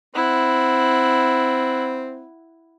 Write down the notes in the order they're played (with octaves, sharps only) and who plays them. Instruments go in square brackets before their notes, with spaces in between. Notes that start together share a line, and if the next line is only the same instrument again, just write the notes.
[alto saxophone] C4 [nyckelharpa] E4 F#5